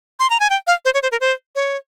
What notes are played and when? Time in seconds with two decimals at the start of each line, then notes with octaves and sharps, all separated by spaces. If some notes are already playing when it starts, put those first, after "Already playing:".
0.20 C6
0.30 A#5
0.40 G#5
0.50 G5
0.67 F5
0.85 C5
0.94 C#5
1.03 C5
1.12 A#4
1.21 C5
1.56 C#5